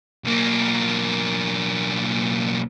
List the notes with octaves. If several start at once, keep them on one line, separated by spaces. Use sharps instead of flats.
B1 A#3